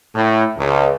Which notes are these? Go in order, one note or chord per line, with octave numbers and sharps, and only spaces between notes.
A2
C#2